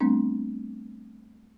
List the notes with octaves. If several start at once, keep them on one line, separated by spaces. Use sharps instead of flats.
G3 A3 B3 C4 D4